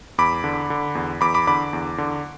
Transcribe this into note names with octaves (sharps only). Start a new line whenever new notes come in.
E2 B5 D6
D3
D3
E2
E2 B5 D6
B5 D6
D3 B5 D6
E2
D3